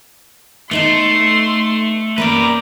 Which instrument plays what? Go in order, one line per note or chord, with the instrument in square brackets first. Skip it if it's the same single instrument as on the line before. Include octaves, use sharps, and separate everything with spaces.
[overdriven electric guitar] A3 [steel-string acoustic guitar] B3 D#4 A4 [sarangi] C6
[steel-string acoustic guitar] A#3 B3 C#4 [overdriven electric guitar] B4 D5 [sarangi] A#5